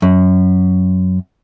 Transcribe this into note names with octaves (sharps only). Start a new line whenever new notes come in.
F#2